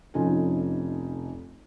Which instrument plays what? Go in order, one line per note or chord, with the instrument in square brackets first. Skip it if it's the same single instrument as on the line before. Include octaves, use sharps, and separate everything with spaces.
[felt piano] F1 F2 C#4 D#4 F4 G#5